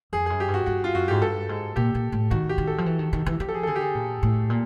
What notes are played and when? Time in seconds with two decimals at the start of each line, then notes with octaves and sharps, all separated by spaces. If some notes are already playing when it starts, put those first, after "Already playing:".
0.13 F2 G#4
0.26 F#2 G#4
0.40 G4
0.48 G2
0.54 F#4
0.66 G2 F#4
0.84 F4
0.94 F#2 F#4
1.08 G#2 G4
1.22 G2 A4
1.49 G#2
1.76 A#2 G4
1.95 A#2
2.12 A2
2.31 D#3 F#4
2.49 G4
2.58 D#3
2.67 A4
2.78 F3
2.86 E3
2.99 D#3
3.13 D#3
3.26 E3
3.40 F3 G4
3.49 A4
3.54 G#4
3.63 A4
3.67 D3 G#4
3.76 G4
3.81 G#4
3.95 A#2
4.23 A2
4.50 A#2